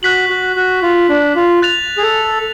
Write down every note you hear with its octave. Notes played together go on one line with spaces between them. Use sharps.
F#4 F#6 B6 F#7
F#4
F#4
F4
D4
F4
F#6 A6 F7
G#4
A4